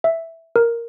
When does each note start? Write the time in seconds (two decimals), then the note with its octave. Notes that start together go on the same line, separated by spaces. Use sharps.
0.04 E5
0.56 A#4